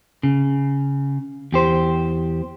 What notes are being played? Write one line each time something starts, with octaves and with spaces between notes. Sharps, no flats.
C#3
E2 G4 C5